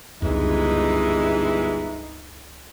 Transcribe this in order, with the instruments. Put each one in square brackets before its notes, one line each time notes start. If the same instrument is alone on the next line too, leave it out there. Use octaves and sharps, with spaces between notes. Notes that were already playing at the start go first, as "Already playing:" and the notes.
[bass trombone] G1 [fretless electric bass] C#2 F#2 [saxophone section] D3 E3 G#3 [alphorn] D#4